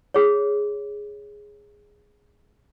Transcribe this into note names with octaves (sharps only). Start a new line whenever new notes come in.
G#4 C#5